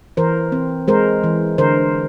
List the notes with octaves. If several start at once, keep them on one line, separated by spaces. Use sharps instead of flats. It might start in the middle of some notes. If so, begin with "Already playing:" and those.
E3 A#4 C5
C4
G#3 A#4 C5
E3
D3 A#4 C5